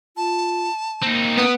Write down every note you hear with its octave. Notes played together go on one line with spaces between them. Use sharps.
F4 A5
A#3 C4 D#4
B3 D#6